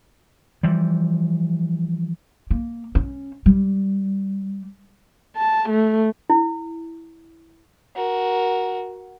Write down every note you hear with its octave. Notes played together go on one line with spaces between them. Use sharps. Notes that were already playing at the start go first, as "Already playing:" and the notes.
E3 F3 G3
A#3
C#4
G3
A5
A3
E4
F#4 A#4